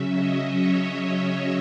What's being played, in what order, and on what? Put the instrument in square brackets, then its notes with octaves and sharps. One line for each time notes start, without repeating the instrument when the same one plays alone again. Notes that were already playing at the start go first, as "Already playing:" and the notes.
Already playing: [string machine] C#3 F#3 C#4 E5
D#5
C#5